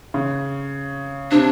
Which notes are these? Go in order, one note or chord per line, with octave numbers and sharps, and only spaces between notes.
C#3
C3 D4